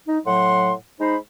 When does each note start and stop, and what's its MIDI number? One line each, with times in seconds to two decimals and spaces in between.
0.08 0.19 63
0.25 0.73 45
0.25 0.73 54
0.25 0.73 78
0.25 0.73 84
1.00 1.17 56
1.00 1.17 63
1.00 1.17 72
1.00 1.17 83